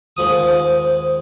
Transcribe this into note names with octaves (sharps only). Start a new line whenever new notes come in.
D#2 G#2 F3 D#6